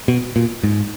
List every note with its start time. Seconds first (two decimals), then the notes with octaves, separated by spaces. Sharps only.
0.08 B2
0.36 A#2
0.63 G#2